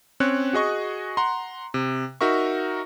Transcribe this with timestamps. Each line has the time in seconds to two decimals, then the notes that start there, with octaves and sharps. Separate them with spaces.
0.20 C4 C#4 C#5 F#6
0.53 F#4 G#4 D#5 C#6
1.17 F#5 A#5 C6
1.74 C3
2.21 D#4 F#4 A#4 E5 C#6